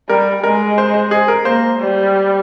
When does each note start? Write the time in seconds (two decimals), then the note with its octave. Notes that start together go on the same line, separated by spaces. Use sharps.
0.09 G3 A#4
0.43 G#3 A#4
0.78 C5
0.94 C5
1.11 G#4
1.28 A#4
1.45 A#3 C5
1.79 G3